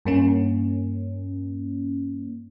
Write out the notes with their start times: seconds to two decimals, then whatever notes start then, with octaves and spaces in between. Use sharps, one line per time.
0.05 G2 A#3 C#4